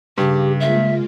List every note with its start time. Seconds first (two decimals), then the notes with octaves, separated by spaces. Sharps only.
0.18 G2 C#3 G4
0.60 G#3 A#3 F4 E5